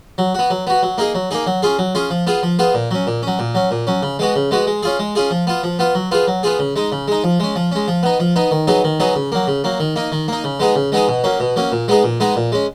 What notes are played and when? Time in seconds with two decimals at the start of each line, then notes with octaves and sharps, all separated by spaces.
0.18 F#3
0.35 B3 F#4
0.50 F#3
0.67 B3 F#4
0.83 F#3
0.98 A#3 D#4 G#4
1.15 F#3
1.31 A#3 D#4 G#4
1.47 F#3
1.62 C#4 F4 G#4
1.79 F#3
1.95 C#4 F4 G#4
2.10 F3
2.27 B3 F4 G#4
2.43 F3
2.59 B3 F4 G#4
2.74 A#2
2.91 F#3 C#4
3.07 A#2
3.23 F#3 C#4
3.39 A#2
3.55 F#3 C#4
3.71 A#2
3.87 F#3 C#4
4.03 C#3
4.19 G#3 B3 F#4
4.36 C#3
4.51 G#3 B3 F#4
4.67 G#3
4.83 C#4 F4 G#4
4.99 G#3
5.15 C#4 F4 G#4
5.31 F3
5.47 B3 F4
5.63 F3
5.79 B3 F4
5.95 F#3
6.11 B3 F4 G#4
6.27 F#3
6.43 B3 F4 G#4
6.59 C#3
6.76 G#3 D#4
6.92 C#3
7.08 G#3 D#4
7.24 F3
7.40 G#3 C#4
7.56 F3
7.72 G#3 C#4
7.88 F3
8.03 B3 D#4
8.20 F3
8.36 B3 D#4
8.51 D#3
8.67 F#3 B3 D#4 G#4
8.84 D#3
9.00 F#3 B3 D#4 G#4
9.16 C#3
9.32 F#3 A#3
9.47 C#3
9.64 F#3 A#3
9.80 D#3
9.96 A#3 D#4
10.12 D#3
10.28 A#3 D#4
10.44 C#3
10.60 G#3 B3 D#4 G#4
10.76 C#3
10.92 G#3 B3 D#4 G#4
11.08 B2
11.24 F#3 A#3 C#4
11.40 B2
11.56 F#3 A#3 C#4
11.72 A#2
11.88 G#3 B3 D#4 G#4
12.04 A#2
12.20 G#3 B3 D#4 G#4
12.36 A#2
12.52 G#3 C#4